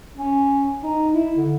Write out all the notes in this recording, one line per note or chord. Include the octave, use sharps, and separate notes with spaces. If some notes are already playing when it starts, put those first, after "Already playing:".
C#4
D#4
E4
D3